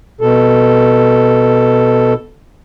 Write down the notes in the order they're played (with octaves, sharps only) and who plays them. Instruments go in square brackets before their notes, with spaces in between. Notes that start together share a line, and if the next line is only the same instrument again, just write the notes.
[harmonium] B2 A4